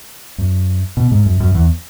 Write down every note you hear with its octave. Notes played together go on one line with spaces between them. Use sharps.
F#2
B2
G#2
F#2
F#2
E2